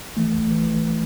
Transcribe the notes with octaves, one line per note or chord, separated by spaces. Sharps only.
E3 A3
A1
E3
E3